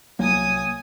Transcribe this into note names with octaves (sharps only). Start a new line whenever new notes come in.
C2 F#3 A#3 G#5 D#6